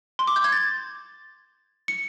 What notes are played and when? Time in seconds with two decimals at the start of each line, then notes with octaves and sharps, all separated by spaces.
0.19 C6
0.27 D6
0.36 G6
0.44 G#6
0.52 A6
1.88 C#7